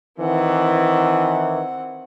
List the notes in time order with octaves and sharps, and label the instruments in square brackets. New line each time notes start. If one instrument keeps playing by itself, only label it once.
[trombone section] D#3 E3 [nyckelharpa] C4 F#5